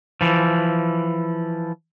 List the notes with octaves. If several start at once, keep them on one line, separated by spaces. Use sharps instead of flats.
E3 F3